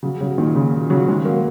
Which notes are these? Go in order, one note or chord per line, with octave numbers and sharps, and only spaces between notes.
C#3 F#3
C#3 F#3
A#2 D#3
C#3
C#3 F#3
D#3 G#3
F#3 A#3